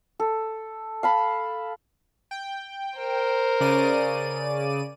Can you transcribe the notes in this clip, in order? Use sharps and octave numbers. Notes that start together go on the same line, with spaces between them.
A4
F5 A5 B5
G5
A#4 C5
C#3 D5 D#7